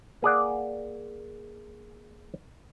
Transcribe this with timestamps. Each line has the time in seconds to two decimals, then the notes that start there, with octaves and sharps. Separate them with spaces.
0.22 A#3 G#4 D5 F#5